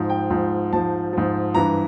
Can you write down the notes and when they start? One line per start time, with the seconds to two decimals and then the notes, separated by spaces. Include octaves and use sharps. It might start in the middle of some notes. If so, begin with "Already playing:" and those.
Already playing: G#2 F3
0.10 G5
0.30 G#2 F3
0.73 G#2 F3 A5
1.13 G#2 F3
1.54 G2 E3 A#5